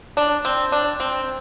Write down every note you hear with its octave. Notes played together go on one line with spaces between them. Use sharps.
D4
C4
D4
C4